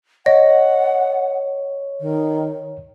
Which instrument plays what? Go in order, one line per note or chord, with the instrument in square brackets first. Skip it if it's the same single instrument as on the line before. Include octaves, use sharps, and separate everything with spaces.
[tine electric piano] C#5 [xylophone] D#5 [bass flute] F#5
[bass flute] D#3